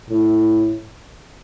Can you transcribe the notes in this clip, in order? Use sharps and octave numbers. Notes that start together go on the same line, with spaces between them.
A2